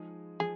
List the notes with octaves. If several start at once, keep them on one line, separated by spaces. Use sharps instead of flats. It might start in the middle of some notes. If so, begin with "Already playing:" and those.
Already playing: F3 G#3 D#4 G#4
F3 G#4